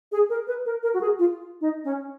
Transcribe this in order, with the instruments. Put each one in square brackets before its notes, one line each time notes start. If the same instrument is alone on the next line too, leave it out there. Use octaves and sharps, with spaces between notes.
[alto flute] G#4
A#4
B4
A#4
A#4
F#4
G#4
F4
D#4
C#4